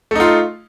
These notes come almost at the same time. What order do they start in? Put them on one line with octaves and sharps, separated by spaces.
A3 D#4 F4